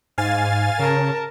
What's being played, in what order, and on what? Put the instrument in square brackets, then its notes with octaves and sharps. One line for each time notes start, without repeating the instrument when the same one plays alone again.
[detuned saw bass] G#2 [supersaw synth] F5 G#5 A6
[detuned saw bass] C#3 [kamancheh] A#4 A5